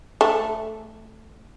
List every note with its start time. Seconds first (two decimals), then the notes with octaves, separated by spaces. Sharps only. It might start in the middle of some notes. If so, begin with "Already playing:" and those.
0.21 A3